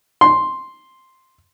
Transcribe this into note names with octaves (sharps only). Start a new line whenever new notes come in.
C6